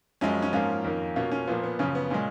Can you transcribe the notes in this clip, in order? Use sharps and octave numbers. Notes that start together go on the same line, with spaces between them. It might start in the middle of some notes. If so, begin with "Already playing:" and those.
F#2 F3 G#3 C#4
C#4
G#2 F3 A#3 C#4 F4
F2 D#3 A#3
B2 A#3 C#4 F4
C#4
A#2 F3 A#3 B3
B3
F#2 C#3 F3 C#4
B3
A#2 G#3 C#4